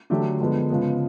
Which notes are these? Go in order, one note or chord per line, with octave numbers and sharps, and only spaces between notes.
D3 F#3 A3 D4 G4
D3 F3 G#3 B3
C#3 F3 G#3 B3